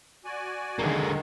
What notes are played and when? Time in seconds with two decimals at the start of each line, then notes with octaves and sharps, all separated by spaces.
0.25 F#4 D5 G#5
0.79 D3 D#3 G#3 A#3